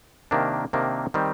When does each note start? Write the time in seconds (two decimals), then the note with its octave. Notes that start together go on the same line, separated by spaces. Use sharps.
0.31 C3 D#3 A#3 D4
0.73 C3 D#3 A#3 D4
1.14 D#3 G3 C4